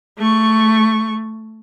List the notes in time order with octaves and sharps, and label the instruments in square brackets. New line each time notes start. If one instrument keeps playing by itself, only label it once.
[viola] A3 C#6